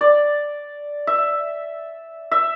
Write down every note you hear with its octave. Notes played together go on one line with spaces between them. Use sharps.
D5
E5
E5